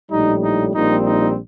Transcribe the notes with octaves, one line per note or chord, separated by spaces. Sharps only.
A#1 A2 G3 D#4
D#4
A#1 A#2 G3 C4 D#4
D#4